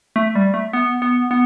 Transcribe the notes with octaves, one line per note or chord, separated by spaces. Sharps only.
A3
G3
A3
B3
B3
B3